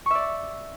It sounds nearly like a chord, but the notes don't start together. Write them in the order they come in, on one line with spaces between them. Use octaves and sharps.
C#6 E5 D5